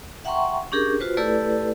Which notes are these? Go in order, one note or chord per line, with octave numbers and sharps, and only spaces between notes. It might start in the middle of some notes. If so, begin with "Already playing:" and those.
E5 F#5 G5 A#5 C6 C#6
C#4 D4 G4 G#4 A#4
F4 F#4 B4 C5
A3 E4 G4 A4 B4 D5